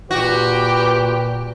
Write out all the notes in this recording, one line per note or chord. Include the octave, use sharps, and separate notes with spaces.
A#2 F#4 G4 B4